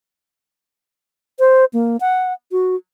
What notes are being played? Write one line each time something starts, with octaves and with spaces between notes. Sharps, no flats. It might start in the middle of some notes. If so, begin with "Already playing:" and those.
C5
A#3
F#5
F#4